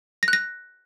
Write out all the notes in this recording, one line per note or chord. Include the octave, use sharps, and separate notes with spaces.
A#6
F#6
A#6